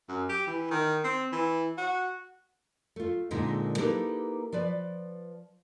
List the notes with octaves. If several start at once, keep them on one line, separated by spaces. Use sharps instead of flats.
F#2
G4
E3
D#3
C4
E3
F#4
A3 F4
A#2 D3 G#3 C4 D#4 A#4
A#3 D#4 E4 G4 A4 B4
F3 B4 D5